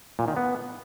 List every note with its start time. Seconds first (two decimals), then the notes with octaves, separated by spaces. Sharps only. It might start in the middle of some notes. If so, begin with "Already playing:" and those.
0.19 A#2
0.28 D#3
0.37 B3